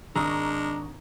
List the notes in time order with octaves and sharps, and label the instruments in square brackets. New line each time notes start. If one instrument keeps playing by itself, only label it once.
[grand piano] G#1 D#6 E6 [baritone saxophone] G#3 [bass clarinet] D4 [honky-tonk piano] A#5 C#6